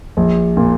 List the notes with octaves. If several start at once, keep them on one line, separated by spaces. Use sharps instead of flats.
A#1
A#2